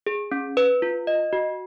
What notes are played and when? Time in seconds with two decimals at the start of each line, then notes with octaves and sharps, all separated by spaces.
0.06 G#4
0.31 C#4
0.57 B4
0.82 F4
1.07 D#5
1.33 F#4